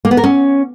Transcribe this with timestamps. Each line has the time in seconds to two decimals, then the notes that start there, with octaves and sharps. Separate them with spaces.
0.05 A#3
0.11 B3
0.17 A#4
0.24 C#4